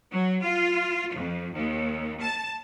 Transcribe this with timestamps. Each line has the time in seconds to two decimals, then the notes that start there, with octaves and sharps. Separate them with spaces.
0.11 F#3
0.42 F4
1.14 F2
1.53 D#2
2.20 A5